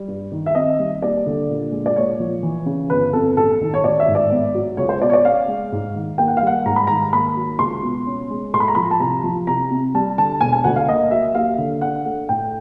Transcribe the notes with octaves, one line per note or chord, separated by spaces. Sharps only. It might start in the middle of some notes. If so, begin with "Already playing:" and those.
Already playing: G3
G2
D#3
E5
C4 D#5
G3
D#2 D5
D3
A#2
G#3
D5
A#2 C#5
F3
E3
C#3
G1 B4
F2 A4
A1 A4
D#3
C#5
A1 D5
E5
G#2
D5
B3
F#3
C#2 C#5
C5
B2 D5
C#5
D5
C#4 F5
G#3
G#2
D#3
A#3 G5
F#5
F5
G3 F#5
G#2 A#5
B5
D#3 A#5
A#3 B5
F#3
C#2 C6
B2
C#4
G#3
A2 C6
B5
A#5
F3 B5
A5
C2 A#5
F3
C2 A#5
C3
G3 A5
D3 A5
E1 G#5
G#5
D2 F#5
F5
A#3 D#5
F#3 E5
D#2 F5
D3
D4 F#5
A3
A2 G5